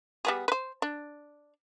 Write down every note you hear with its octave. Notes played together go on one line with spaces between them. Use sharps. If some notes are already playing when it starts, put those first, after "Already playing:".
G3 B3 G#4
B4 C5
D4